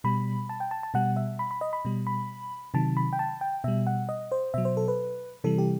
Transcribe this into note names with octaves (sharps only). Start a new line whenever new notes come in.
B2 G3 B5
A5
G5
A5
A5
B2 G3 F#5
E5
B5
B5
D#5
B5
B2 G3
B5
C3 D#3 F#3 A5
B5
G5
A5
G5
B2 G3 E5
F#5
D#5
C5
B2 F#3 E5
C5
A4
B4
C3 E3 G3 A4
G4